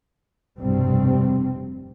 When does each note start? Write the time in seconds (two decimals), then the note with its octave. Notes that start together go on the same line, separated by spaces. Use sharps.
0.59 F1 B1 G2 C3 G3 C4